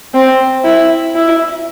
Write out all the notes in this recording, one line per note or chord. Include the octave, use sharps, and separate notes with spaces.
C4
E4
E4